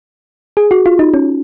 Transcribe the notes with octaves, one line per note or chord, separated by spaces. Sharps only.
G#4
F#4
F4
D#4
C#4